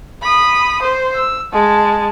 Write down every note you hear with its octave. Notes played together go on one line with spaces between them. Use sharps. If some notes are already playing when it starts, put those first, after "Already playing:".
B5 D#6
C5
E6
G#3 A5